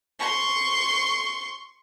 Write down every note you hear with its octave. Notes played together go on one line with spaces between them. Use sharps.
C6 C#6